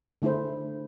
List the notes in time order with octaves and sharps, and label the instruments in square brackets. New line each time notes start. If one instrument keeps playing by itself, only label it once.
[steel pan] D3 A3 E4 G#4 C5